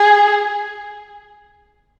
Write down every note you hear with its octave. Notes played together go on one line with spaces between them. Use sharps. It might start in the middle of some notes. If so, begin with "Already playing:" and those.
Already playing: G#4